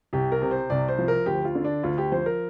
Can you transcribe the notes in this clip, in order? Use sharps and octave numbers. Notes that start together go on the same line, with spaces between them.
C2 G4
A#4
C3
C5
C2 D5
C5
F3
A#4
D2 G4
F4
D3
D4
D2 F4
G4
F3 C5
A#4